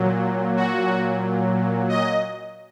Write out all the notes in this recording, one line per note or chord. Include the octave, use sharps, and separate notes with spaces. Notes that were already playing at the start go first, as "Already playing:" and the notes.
Already playing: A#2 F#3
F#4
D#5